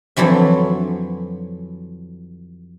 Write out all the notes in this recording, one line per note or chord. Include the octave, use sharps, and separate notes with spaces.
F2 D3 E3 F#3 E5